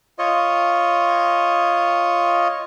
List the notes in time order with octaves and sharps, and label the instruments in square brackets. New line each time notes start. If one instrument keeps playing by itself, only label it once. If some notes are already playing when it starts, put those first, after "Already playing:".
[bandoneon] F4 C#5 D#5